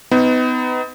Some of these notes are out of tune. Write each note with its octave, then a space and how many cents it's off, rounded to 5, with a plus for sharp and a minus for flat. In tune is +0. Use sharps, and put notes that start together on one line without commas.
B3 +35 D#4 +25